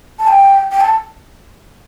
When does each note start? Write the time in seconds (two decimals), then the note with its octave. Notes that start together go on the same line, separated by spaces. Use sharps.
0.19 A5
0.28 G5
0.72 G5
0.81 A5